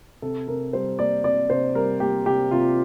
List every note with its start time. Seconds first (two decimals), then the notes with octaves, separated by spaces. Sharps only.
0.22 C3 A4
0.48 C3 A#4
0.73 G3 C5
0.99 A#3 D5
1.24 C3 D5
1.50 C3 C5
1.75 G3 A#4
2.00 A#3 G4
2.26 C3 G4
2.51 C3 F4